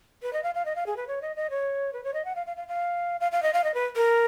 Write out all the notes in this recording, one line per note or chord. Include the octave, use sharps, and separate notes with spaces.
B4
D#5
F5
F5
D#5
F5
G#4
B4
C#5
D#5
D#5
C#5
B4
C#5
D#5
F#5
F5
F5
F5
F5
F5
F5
D#5
F5
D#5
B4
A#4